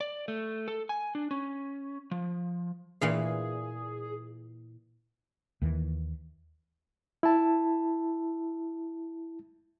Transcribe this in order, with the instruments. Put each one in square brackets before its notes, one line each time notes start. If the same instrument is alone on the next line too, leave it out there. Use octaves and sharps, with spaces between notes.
[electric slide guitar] D5
A3
A4
G#5
D4
C#4
F3
[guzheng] A#2 E3 F5 [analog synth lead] G#4
[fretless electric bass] D#2 D#3 E3
[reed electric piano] E4 A5